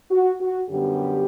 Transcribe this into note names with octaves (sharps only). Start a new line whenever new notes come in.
F#4
F#4
F#2 D3 G3 B3 G4